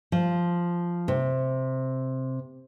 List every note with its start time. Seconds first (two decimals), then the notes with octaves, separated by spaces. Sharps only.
0.12 F3
1.08 C3